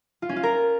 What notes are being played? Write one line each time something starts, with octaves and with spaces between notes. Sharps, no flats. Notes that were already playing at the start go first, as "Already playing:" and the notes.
F4
C#4
F4
A#4